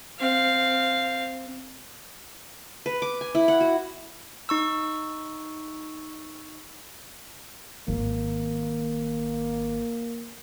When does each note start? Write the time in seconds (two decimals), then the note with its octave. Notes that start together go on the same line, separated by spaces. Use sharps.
0.19 C4 F5
2.86 B4
3.02 D6
3.21 G#5
3.35 E4
3.48 F#5
3.61 F#4
4.49 D#4 C#6 E6
7.88 G#1 D#3 A#3